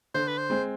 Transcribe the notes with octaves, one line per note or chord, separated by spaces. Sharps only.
D3 C5
B4
C5
G#3 C4